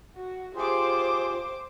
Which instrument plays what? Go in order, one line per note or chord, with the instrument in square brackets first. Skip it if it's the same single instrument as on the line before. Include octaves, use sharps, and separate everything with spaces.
[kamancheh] F#4
[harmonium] F4 G4 G#4 [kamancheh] C5 D6